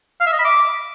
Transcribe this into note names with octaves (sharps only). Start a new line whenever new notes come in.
F5
E5
D#5
B5
D6